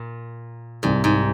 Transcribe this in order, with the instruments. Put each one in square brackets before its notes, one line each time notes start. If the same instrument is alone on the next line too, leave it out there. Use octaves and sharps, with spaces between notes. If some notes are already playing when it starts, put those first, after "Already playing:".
Already playing: [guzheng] A#2
[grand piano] C2 C3 G3 [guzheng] G#2
[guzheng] G#2